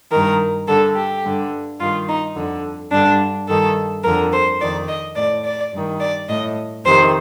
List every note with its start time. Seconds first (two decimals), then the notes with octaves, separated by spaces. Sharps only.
0.11 G2 D#3 A#4
0.66 G2 D3 A4
0.95 G4
1.24 G2 D3
1.79 G2 D#3 F4
2.08 D#4
2.35 F2 D3
2.91 G2 D3 D4
3.48 G2 D#3 A4
4.03 F2 D3 A#4
4.32 C5
4.60 F2 D#3 D5
4.88 D#5
5.16 A2 D5
5.45 D5
5.72 G2 D#3
6.00 D5
6.28 A2 D#5
6.84 F2 C3 D#3 C5